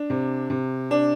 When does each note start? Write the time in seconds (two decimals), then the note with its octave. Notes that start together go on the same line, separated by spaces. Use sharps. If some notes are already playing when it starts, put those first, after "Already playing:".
Already playing: D4
0.10 C3
0.50 C3
0.91 D4